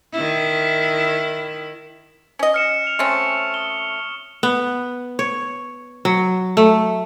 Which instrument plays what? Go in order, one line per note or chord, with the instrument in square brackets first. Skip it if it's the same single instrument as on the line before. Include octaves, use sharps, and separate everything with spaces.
[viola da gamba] D#3 E4
[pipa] C#4 D#5
[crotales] F6 C#7 E7
F7
[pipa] A3 C4 C#4 [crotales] C#6
[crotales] D#6 G7
[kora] B3
C#5
F#3
A3